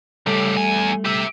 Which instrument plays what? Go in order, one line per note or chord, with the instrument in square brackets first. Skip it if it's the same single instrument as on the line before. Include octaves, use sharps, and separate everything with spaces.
[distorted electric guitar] C#3 G4 [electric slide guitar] G3 A3 A4
[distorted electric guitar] E2 G#5
G4 E5